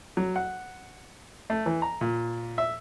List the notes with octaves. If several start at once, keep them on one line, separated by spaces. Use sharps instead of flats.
F#3
F#5
A3
E3
A#5
A#2
E5